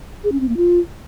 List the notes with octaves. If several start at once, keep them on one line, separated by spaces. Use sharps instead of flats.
G#4
C#4
C4
A#3
F4